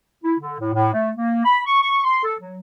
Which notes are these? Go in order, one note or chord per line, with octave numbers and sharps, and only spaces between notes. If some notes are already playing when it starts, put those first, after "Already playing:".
E4
D3
A2
A2
A3
A#3
B5
C#6
C#6
C6
A4
F#3